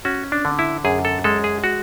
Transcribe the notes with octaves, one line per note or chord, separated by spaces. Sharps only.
C#4 F#4
D4
D3
E4
F#2 G#4
A4
G#3 A4
G#4
F#4